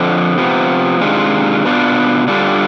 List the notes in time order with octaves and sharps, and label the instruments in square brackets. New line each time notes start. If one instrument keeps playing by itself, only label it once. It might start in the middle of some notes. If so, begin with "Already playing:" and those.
Already playing: [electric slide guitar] F2 D3 F3
C3 F3 B3
C3 D#3 G#3 D4 F4
B2 B3 D4 F4
D3 G3 D4 F4